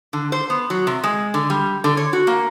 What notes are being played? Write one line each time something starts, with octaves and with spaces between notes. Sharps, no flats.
D3
C5
B3
F#3
C3
G#3
D3
G3
D3
C#5
F#4
A#3